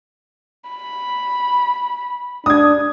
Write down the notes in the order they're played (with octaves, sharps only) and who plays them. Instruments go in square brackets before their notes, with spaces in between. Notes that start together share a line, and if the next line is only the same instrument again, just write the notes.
[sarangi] B5
[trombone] D4 [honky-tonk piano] D#6 G#6